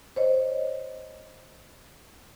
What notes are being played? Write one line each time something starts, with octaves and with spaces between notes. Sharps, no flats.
C5 C#5 D#5